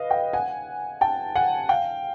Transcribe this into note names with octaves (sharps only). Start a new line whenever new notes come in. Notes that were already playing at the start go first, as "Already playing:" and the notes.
Already playing: B4 D#5 F5
F5 G5
F#5 G#5
G5 A5
F#5 G#5
F5 G5